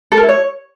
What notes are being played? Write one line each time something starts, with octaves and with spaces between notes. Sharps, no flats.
A4
A#4
E4
C#5